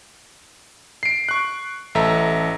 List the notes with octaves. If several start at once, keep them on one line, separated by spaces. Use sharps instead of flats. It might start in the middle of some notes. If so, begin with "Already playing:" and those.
C7 D7
C#6 F#6
A1 A4 E5 A#5